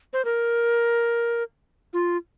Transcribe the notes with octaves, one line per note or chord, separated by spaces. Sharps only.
C5
A#4
F4